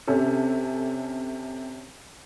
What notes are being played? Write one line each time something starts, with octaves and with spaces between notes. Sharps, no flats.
C3 C#4 A4